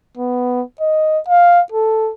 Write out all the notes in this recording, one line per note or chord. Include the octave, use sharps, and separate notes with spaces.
B3
D#5
F5
A4